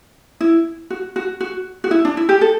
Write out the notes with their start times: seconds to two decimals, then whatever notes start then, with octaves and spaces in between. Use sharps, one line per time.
0.41 E4
0.90 F#4
1.16 F#4
1.40 F#4
1.84 F#4
1.91 E4
2.05 D4
2.17 E4
2.29 G4
2.41 A4